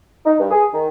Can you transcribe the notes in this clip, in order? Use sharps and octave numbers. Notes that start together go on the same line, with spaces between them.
D#4
G2
G#4
D#3